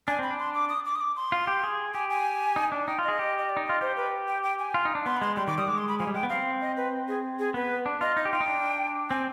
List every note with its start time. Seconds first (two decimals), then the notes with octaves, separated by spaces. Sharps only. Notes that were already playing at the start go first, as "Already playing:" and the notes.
0.08 D4 G#5
0.19 C4 B5
0.31 D4
0.39 C6
0.54 D6
0.69 D#6
0.85 D6
0.95 D#6
1.01 D6
1.16 C6
1.32 F4
1.47 G4
1.64 G#4
1.94 G4 G#5
2.10 G#5
2.56 D#4
2.72 D4
2.87 D#4 G5
2.98 F4 D#5
3.08 G#4
3.19 G4
3.38 D#5
3.49 D5
3.57 D#4
3.65 F4 D#5
3.81 G4 C5
3.97 B4
4.28 G5
4.43 G5
4.59 G#5
4.74 F4
4.85 D#4
4.95 D4
5.06 B3 C6
5.17 B5
5.21 G#3 C6
5.36 G3 C6
5.47 D#3 D6
5.58 G3 D#6
5.67 G#3 D6
5.78 C6
5.88 B5
5.99 F3 G#5
6.07 G3
6.14 G#3 G5
6.23 B3
6.29 C4 F5
6.61 D#5
6.77 B4
7.08 G#4
7.39 G#4
7.54 B3 B4
7.86 D4
8.01 F4 D#5
8.17 D#4 D#5
8.25 G4
8.32 F4 G5
8.41 D#4
8.48 D4
9.10 C4 G#5